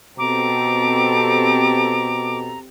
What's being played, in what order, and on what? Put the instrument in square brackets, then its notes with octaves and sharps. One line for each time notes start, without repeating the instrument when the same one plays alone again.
[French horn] B2 [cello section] C4 G4 A4 [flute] A#5 [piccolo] D6